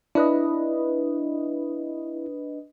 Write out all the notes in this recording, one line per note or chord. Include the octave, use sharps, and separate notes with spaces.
D4 E4 B4 D#5